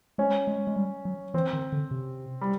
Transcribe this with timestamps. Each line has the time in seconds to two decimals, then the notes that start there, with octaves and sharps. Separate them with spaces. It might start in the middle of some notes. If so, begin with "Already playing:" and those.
0.18 G#3 C#4
0.47 G#3
0.67 G#3
0.76 G3
1.05 F#3
1.34 E3 C4
1.53 D#3
1.72 D3
1.91 C3
2.41 G3